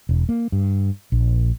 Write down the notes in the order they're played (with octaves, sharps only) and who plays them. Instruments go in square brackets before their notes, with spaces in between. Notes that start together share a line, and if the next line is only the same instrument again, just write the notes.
[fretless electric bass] E1
A#3
G2
A#1